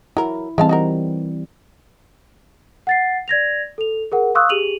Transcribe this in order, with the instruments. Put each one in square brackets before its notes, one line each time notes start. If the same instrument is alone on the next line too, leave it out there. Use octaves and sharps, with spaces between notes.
[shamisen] F#3 A#4 [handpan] E4
[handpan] E3 G3 C4 [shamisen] G#3 F5 A5
[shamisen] D#4 F#4 A#4
[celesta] F#5 A6 C7
D5 G#6 A#6 F7
A4 F7
G#4 A#4 F#5
F5 C6 C#6 D#6 E6 F#6
G4 G#4 D#7 F7 F#7